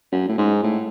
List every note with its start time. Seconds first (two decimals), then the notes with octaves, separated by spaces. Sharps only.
0.12 F#2
0.29 A2
0.38 G#2
0.63 A2